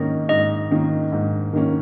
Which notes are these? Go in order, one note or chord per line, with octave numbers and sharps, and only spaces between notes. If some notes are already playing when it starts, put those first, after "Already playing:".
Already playing: G#2 D#3 A#3 C#4 D#5
G#2 D#5
D#3 A#3 C#4
G#2
D#3 A#3 C#4